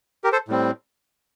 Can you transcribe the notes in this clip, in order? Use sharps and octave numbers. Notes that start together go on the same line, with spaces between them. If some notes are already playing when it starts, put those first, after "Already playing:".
G4 A#4
A4 C5
A2 G3 C4